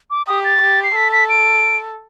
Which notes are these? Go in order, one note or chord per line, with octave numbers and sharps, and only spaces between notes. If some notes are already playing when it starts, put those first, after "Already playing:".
D6
G4 D#6
A6
G4
C7
A4 B6
B6
D7